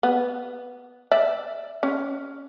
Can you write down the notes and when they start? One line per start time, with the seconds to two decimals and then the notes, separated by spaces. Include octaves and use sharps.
0.03 B3
1.11 D5 E5
1.83 C#4